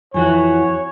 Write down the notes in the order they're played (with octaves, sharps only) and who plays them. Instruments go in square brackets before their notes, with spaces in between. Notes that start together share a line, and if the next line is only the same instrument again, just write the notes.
[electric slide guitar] F2 E3 F#4 [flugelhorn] C#5 [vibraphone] G#5